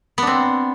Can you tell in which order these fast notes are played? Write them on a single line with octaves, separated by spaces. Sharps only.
B3 D4 C4